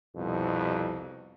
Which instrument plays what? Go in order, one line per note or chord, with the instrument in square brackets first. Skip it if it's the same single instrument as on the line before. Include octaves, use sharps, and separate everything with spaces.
[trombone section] C2 F2 B2